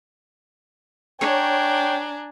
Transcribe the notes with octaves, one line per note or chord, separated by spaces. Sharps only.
D4 C#5 G5 G#5 A#5